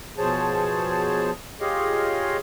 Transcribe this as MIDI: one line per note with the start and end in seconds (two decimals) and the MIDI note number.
0.18 1.31 47
0.18 1.31 53
0.18 1.31 68
0.18 1.31 72
0.18 1.31 73
0.18 1.31 81
1.61 2.37 65
1.61 2.37 67
1.61 2.37 68
1.61 2.37 73
1.61 2.37 75
1.61 2.37 77